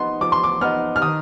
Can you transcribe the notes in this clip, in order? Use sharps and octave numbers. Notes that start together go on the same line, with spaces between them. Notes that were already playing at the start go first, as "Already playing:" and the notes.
Already playing: F3 B3 D#4 C6
F3 D6
C6
D6
B3 D#4 F6
F6
D#3 D#6